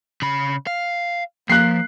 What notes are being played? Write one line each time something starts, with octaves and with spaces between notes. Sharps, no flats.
C#3 B5
F5
F3 A#3 F#6 C7